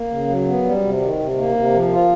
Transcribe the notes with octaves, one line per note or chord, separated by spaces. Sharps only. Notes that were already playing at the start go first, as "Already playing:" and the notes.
Already playing: A#3
C#3
F#3
B3
G3
C3
D#3
C3
A#3
C3
F3
F4